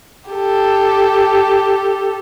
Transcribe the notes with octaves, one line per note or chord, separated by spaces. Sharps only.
G4 A4